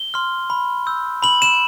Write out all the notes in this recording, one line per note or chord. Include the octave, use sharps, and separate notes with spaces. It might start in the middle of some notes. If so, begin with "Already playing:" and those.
Already playing: G7
C6 F6
B5
E6 G6
B5 F#7
E7